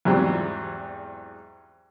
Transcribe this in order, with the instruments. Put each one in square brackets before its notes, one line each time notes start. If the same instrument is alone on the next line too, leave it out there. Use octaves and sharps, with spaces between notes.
[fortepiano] E2 G#2 F#3 G3 C4